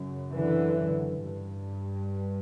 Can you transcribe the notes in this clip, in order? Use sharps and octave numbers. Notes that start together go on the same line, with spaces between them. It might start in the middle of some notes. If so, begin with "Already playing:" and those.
Already playing: F#2 C#3
D3 E3
G2